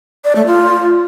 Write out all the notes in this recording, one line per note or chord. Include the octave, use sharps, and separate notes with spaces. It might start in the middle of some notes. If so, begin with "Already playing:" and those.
D5
A3
F4